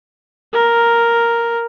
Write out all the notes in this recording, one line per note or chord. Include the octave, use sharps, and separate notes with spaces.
A#4